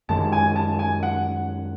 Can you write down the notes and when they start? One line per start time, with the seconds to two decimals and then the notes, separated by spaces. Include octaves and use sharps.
0.09 F#2 D#3 G#3 A5
0.32 G#5
0.56 A5
0.79 G#5
1.03 F#5